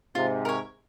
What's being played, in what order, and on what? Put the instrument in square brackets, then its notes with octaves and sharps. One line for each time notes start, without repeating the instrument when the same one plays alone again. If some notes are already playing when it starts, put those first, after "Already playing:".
[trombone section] G#2 C3 [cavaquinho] F4
[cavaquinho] A#4 C#5